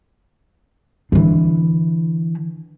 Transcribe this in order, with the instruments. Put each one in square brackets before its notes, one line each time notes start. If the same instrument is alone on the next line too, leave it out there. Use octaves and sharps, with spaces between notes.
[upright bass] D3 E3